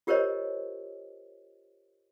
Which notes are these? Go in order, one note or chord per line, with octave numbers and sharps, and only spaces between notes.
F4 G4 A#4 C5 C#5 D#5